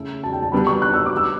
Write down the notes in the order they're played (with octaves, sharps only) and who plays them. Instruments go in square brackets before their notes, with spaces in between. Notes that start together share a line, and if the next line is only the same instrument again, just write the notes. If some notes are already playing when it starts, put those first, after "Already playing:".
Already playing: [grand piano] C#3 A3 E4
[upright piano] A5
G5
A5
[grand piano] D3 G3 B3 D4 [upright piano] B5
[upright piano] C#6
F#6
E6
D6
E6